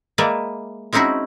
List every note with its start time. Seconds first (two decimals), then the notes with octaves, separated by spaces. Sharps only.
0.18 G#3 A#3 B4 D5 E5
0.93 G#3 C4 C#4 D#4 E4 F#4